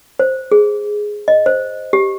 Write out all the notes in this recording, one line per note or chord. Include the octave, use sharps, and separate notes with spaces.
C5
G#4
D#5
C5
G4